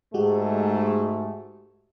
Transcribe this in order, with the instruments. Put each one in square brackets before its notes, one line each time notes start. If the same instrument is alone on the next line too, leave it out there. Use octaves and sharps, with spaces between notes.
[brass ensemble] G#2 A3 [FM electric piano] G#3 F#4 G4